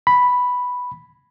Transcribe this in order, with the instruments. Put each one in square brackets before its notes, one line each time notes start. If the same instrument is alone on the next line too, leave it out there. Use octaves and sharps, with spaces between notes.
[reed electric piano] B5